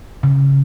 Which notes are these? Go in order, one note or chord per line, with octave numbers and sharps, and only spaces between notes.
C#3